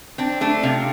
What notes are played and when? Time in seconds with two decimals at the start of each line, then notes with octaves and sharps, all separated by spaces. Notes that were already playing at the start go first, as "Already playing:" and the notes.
0.18 C4 D4
0.41 A3 D4
0.63 C3 F4